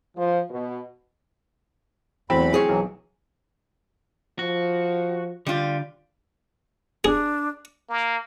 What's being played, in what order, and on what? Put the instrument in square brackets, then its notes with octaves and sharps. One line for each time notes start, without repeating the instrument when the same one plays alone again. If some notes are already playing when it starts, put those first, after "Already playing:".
[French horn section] F3
B2
[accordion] E2 B5 [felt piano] E3 F#3 A3 [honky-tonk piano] C4
[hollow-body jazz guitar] G#4 C#5
[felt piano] B1 [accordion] E3 F#3
[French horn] F3 [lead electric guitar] F#4
[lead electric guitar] D3 [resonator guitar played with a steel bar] G3 F4
[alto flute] D4 [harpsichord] G#4
[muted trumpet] A#3